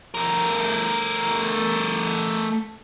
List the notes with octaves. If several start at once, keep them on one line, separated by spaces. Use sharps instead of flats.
A3 A#4